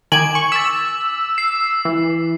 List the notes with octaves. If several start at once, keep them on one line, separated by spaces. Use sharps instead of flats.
D#3 G#5 D6 D7 F#7
C#6
E6 A6 B6
C7
E3